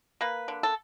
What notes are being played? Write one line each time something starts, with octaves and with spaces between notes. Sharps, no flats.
A#3 B4
D3
A4